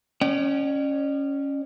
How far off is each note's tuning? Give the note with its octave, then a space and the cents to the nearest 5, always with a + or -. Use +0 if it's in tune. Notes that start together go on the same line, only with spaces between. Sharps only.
C#4 +0 D5 +45 G5 -40